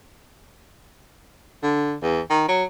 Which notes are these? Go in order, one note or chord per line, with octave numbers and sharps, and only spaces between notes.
D3
E2
D#3
F#3